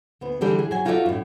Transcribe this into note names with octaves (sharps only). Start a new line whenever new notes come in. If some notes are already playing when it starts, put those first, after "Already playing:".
D2 B3
D3 E3 G3 D4 G4 G#4
G#4
F#3 G#5
D#4 F4 F#4 A4 D5 E5
F#2 A2